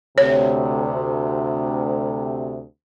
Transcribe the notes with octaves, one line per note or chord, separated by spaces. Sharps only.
D2 C3 C#5